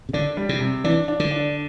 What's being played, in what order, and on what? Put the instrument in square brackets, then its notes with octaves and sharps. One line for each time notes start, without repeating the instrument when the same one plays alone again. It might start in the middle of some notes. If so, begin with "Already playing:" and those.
[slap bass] C3
[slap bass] D3 [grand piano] D4
[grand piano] G3
[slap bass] C3
[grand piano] C3
[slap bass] E3 [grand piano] D4
[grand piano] D4
[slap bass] D3
[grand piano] D4